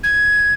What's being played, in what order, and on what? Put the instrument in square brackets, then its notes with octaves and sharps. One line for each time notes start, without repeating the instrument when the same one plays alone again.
[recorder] G#6